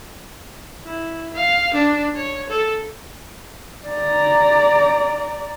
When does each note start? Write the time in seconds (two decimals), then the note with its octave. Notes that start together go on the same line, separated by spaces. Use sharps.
0.84 E4
1.34 F5
1.74 D4
2.16 C#5
2.49 A4
3.88 D5 A#5